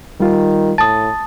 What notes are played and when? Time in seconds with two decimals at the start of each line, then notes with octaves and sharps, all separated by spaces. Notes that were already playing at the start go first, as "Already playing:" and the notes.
0.20 D#3 G3 F4
0.78 A2 A5 D#6 A6